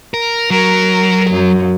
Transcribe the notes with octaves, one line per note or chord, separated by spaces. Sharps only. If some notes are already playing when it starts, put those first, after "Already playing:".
A#4
F#3 A#4
F#2